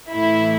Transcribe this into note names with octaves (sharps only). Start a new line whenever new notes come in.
A2 E3 A3 E4